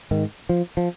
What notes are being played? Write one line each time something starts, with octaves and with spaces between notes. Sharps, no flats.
G#2 D#3
F3
F3